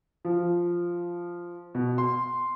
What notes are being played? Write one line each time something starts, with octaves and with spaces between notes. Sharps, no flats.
F3
B2
C6